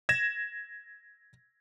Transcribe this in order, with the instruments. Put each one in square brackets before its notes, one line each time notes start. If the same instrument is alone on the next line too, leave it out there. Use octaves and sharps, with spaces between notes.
[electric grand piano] G#6 A#6 E7